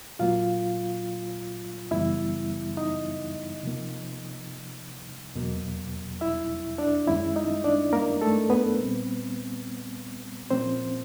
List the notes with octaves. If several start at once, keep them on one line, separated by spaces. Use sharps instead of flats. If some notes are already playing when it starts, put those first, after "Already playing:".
A#2 F#3 A#3 F4 F5
F#2 C#3 E3 G3 B3 E4 E5
D#4 D#5
C3 F3 A#3
E2 B2 F#3 A#3
E4 E5
D4 D5
F#2 D#3 G#3 C#4 E4 E5
D#4 D#5
D4 D5
A#3 A#4
A3 A4
B3 B4
A#2 G3 C4
A#2 F3 A#3 C4 C#4 C5